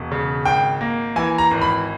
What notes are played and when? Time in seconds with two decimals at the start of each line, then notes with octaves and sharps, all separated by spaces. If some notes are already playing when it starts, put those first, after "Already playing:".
Already playing: E1
0.12 C#3
0.45 G#1 G5
0.81 A#3
1.16 E3 G#5
1.38 A#5
1.51 G#1
1.62 B5